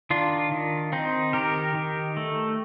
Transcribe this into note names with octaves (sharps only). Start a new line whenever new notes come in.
D#3 D4 F4
D#3
C4 D#4
D#3 G4 A#4
D#3
A3